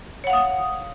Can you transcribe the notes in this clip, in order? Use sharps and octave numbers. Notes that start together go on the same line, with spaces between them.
C#5 F5 F#5 D#6